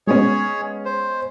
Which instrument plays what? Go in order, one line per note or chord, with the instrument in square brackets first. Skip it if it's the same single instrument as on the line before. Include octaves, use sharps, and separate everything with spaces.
[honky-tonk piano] G#3 B3 C#4 [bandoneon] G#4 C#5
[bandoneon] C5